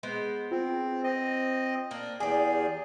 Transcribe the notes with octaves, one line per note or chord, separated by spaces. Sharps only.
G#3 B3 C5
C4 F4
C4 D#5
A#3 D4
E2 G4 G#4 D5 G#5